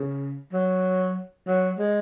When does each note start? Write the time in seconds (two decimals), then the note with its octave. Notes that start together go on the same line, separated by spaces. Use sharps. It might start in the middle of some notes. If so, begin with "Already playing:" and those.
Already playing: C#3
0.53 F#3
1.47 F#3
1.78 G#3